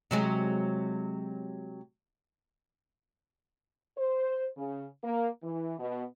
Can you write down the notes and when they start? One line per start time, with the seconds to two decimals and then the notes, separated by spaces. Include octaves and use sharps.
0.11 C3 F#3 G#3
3.98 C5
4.57 C#3
5.03 A#3
5.43 E3
5.79 B2